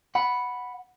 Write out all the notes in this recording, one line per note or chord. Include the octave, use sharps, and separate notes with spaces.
F#5 B5